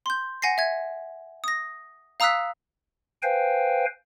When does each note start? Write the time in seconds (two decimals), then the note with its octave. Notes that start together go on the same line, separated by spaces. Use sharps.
0.06 C6 G6
0.42 F#5 G#5 A#6 C7
0.58 E5 G#6
1.44 D#6 A#6
2.20 F5 A#5 D#6 E6 F#6 B6
3.22 B4 C5 F5 G5 G#5